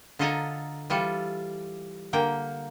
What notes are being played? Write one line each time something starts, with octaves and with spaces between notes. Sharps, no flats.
D3 F4 A4 D#5 G#5 A#5
E3 G3 F4 A4
D3 A#3 G5